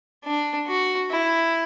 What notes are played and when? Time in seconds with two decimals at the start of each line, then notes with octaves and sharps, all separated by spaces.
0.25 D4
0.67 F#4
1.10 E4